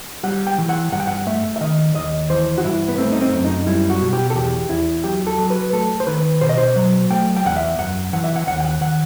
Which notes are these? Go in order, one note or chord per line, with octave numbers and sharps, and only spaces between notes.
G3 F#5
G5
E3
F#5
G2 F#5
G5
F#5
A3 E5
E5
D#3 D#5
D#2 D#5
E3 C5
F#4
G2 E4
B3
A3 C4
D#4
C4
F#2
D#4
G3 E4
F#4
B2
G4
A4
E2 G4
E2 E4
F#3 G4
A4
F#3
B4
A3 A4
C5
D#3 B4
B2 C5
D#5
C5
F#3
A3 G5
G5
E2 F#5
E5
F#2 F#5
E3 F#5
E5
F#5
D#2 F#5
G5
F#5
D#3 F#5